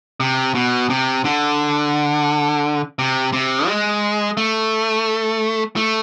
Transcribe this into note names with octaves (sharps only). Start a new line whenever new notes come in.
C3
B2
C3
D3
C3
C3
G#3
A3
A3